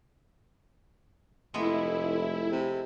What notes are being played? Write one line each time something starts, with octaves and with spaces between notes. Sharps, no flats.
F1 G#3 A3 B3 E4
C3